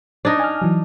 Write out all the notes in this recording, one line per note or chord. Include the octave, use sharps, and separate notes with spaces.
D4 D#4
G#5 F6
E3 F#3